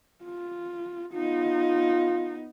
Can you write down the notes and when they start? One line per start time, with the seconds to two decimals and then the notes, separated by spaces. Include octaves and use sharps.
0.24 F4
1.14 B3 D#4 F4